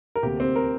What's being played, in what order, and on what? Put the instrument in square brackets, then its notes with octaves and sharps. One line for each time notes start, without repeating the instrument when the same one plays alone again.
[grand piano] A#4
D2 C3 A#3 G4
C4
A#4